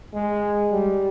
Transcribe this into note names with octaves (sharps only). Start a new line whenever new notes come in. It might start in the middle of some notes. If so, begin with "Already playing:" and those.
G#3
G3